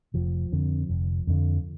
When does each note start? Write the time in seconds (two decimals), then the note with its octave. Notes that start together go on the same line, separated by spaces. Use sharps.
0.14 F1 F3
0.52 F2 D3
0.89 F1
1.27 F2 D3